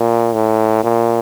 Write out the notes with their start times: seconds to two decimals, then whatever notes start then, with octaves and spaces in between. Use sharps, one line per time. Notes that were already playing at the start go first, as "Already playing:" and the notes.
Already playing: A#2
0.34 A2
0.84 A#2